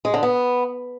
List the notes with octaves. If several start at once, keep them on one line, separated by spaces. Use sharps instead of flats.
G#3
D3
B3